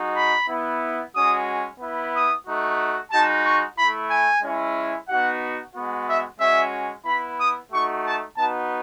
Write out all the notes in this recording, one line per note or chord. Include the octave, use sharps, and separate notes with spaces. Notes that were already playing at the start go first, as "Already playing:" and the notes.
Already playing: G#3 D#4 F#4
B5
B3 E4
G#3 C#4 F#4 D#6
B3 E4
D#6
A3 D#4 F#4
G#3 D#4 F#4 A5
C#6
A3 E4 B5
G#5
G#3 C#4 E4
B3 D#4 F#4 F#5
G#3 B3 F#4
E5
G#3 C#4 F#4 E5
B3 E4 B5
D#6
A3 D#4 F#4 C#6
A5
B3 D#4 F#4 A5